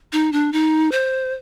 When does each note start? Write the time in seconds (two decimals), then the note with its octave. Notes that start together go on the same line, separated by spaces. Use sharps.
0.12 D#4
0.32 D4
0.52 D#4
0.92 C5